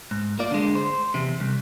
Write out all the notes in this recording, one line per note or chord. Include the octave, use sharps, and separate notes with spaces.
G#2
A#3 F4 D5
D3 G#3
C5
E2 C3
C2